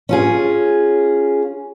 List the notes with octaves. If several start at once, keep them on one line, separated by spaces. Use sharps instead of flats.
C#4 F4 G#4